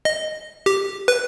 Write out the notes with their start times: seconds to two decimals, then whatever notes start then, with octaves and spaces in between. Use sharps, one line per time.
0.05 D#5
0.66 G4
1.08 B4